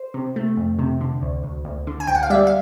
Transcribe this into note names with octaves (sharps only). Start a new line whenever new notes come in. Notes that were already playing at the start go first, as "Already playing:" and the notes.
Already playing: C5
C3
A3
F2
C3
D3
D2
D2
D2
D3
G#5
D2 G5
F#5
F5
G3 D5 E5
F5